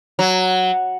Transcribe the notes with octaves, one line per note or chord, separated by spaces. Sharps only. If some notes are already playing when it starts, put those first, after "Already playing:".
F#3